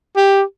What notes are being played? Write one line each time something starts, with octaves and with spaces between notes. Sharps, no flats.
G4